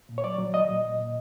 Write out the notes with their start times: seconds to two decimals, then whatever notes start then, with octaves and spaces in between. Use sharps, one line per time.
0.09 A#2
0.18 C#5
0.24 F#3 D5
0.39 F#3
0.54 F#3 D#5
0.69 A#2
0.85 A#2
1.00 A#2